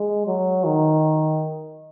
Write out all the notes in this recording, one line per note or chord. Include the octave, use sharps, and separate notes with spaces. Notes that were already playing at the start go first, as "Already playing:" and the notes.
Already playing: G#3
F#3
D#3